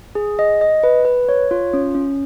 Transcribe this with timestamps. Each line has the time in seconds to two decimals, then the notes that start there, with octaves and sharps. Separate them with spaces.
0.15 G#4
0.39 D#5
0.61 D#5
0.83 B4
1.05 B4
1.29 C#5
1.51 F4
1.73 C#4
1.95 C#4